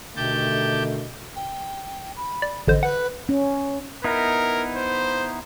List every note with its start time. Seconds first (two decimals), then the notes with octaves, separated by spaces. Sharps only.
0.16 B2 D3 D#3 A3 G4 A5 G6
1.36 G5
2.16 B5
2.42 D5
2.67 A1 D3 C5 D#5
2.83 B4 F#5
3.29 C#4
4.04 B3 D#4 E4 A#4
4.75 C5